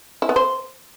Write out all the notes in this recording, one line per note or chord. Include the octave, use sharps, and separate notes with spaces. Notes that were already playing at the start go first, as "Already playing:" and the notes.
E4
B3
C5